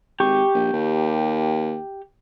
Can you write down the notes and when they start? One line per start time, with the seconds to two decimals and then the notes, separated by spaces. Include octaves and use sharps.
0.20 G#1 G4 C#6
0.54 A#1
0.73 D#2